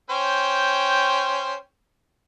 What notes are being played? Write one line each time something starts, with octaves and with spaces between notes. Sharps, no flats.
C#4 C5 G5